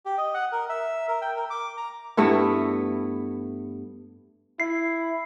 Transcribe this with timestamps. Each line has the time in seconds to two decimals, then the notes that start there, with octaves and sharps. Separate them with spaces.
0.06 G4
0.18 D#5
0.34 F#5
0.52 A#4
0.69 E5
1.08 A#4
1.22 G5
1.36 A#4
1.50 D6
1.77 A#5
2.17 G2 A3 B3 E4
4.60 E4 C7